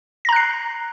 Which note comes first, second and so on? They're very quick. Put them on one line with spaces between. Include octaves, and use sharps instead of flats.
A#6 A#5 F#6 C7